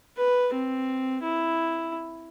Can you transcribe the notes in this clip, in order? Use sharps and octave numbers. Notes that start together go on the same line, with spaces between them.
B4
C4
E4